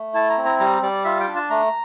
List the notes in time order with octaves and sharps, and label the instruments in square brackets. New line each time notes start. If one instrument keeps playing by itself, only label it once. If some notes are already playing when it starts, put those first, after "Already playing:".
Already playing: [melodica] A3
E4 A5
A#5
C4
A#5
G3 A#5
G3 D5
F4 E5
G5
D4
A5
A3 A#5